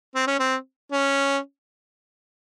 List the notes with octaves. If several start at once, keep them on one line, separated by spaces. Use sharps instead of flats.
C4
C#4
C4
C#4